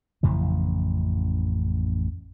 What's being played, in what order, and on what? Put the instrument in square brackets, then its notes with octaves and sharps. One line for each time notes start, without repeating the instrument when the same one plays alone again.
[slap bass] A1 F2 C#3 E3